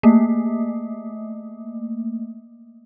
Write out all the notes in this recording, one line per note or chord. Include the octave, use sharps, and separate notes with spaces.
A3 A#3